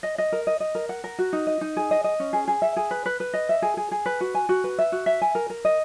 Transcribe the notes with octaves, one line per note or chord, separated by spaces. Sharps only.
D#5
D#5
A#4
D#5
D#5
A#4
F#5
A#4
F#4
D#4
D#5
D#4
G#4
D#5
D#5
C#4
G#4
G#4
E5
G#4
B4
B4
B4
D#5
E5
G#4
G#4
G#4
B4
F#4
G#5
F#4
B4
E5
F#4
E5
G#5
A#4
A#4
D#5